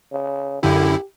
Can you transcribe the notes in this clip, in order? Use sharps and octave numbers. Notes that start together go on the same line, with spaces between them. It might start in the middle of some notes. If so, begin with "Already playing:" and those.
C#3
F#2 D3 E4 G4